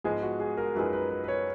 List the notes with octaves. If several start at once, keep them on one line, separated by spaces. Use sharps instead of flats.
G#2 F3 G#3 B3 G#4
F#4
G#4
A#4
F#2 F3 G#3 D#4 G#4 B4
B4
B4
B4
C#5